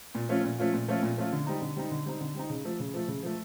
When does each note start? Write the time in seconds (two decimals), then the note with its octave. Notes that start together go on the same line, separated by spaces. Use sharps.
0.15 A#2
0.29 F3 A3 C#4 F4
0.44 A#2
0.58 F3 A3 C#4 F4
0.73 A#2
0.88 F3 A3 C#4 F4
1.03 A#2
1.17 F3 A3 C#4 F4
1.32 D3
1.47 G3 C4 D#4
1.61 D3
1.76 G3 C4 D#4
1.91 D3
2.06 G3 C4 D#4
2.21 D3
2.35 G3 C4 D#4
2.50 C#3
2.65 F3 A3
2.80 C#3
2.94 F3 A3
3.08 C#3
3.23 F3 A3